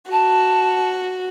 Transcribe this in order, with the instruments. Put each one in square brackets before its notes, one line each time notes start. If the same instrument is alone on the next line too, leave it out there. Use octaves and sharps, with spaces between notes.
[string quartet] F#4 [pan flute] A5